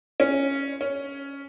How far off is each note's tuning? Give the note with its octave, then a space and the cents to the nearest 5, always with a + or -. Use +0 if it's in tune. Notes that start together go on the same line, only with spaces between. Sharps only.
C#4 -5
C#4 +5